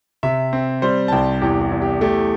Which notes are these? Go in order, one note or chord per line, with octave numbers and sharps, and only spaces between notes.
C3 E5
C4
G3 C5
A5
C2 G5
E2 G4
G4
E2
G4
A3 G4